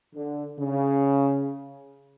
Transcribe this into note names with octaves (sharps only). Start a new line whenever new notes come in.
D3
C#3